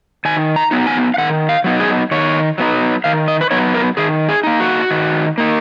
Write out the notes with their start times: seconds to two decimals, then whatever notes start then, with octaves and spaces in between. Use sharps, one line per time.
0.25 D#3 G#5
0.56 A#5
0.71 F#3 B3 D#4
0.87 G#5
1.14 F5
1.18 D#3 F#5
1.49 F5
1.64 F#3 B3 D#4
1.80 G#4
2.11 D#3 C#5
2.58 F#3 B3 D#4
3.04 D#3 F5
3.28 D#5
3.41 B4
3.51 F#3 B3 D#4 C#5
3.74 A#4
3.97 D#3 G#4
4.29 G#4
4.43 A#3 D#4
4.60 F#4
4.90 D#3
5.38 A#3 D#4